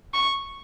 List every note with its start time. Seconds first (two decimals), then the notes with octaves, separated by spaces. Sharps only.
0.14 C#6